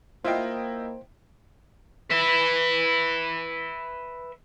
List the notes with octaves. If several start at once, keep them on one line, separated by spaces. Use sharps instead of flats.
A#3 E4 F4 C5 D#5 F5 G5
B4 E5